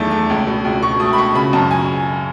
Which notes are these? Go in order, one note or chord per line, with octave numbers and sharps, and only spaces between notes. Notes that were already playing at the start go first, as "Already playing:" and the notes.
Already playing: E2 D#3 F#3 A3
A3
C#2
B2
C#2
B2 C#6
A3 D#6
B5
B2 C#6
C#3 B5
F#2 A5
G#5